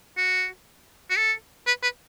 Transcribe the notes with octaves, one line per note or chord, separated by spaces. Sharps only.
F#4
F#4
A4
B4
B4